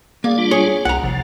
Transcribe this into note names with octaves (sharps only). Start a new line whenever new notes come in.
A#3 G#4 D5
G3 D4 F4
G#4 C#5
C2 F#5 A#5
G#1 C3 F3